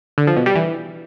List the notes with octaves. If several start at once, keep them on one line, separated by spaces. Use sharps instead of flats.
D3
F3
B2
G3
E3